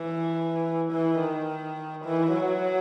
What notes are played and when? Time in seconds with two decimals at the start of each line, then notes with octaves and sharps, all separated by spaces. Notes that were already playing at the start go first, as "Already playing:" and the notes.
Already playing: E3
0.92 E3
1.20 D#3
2.05 E3
2.32 F#3